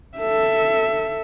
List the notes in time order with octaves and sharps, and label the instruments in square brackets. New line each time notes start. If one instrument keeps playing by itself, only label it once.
[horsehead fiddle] A4 E5